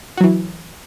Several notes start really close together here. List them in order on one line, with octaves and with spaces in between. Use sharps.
F#4 F#3 E3